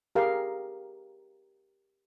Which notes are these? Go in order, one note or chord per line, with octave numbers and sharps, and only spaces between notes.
G4 G#4 A#4 F5